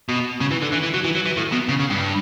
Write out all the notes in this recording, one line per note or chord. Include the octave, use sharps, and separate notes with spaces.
B2
C#3
E3
D3
E3
E3
F#3
E3
F#3
E3
A2
B2
C#3
C#3
G2